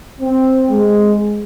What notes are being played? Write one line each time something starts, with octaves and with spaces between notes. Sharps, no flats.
C4
G#3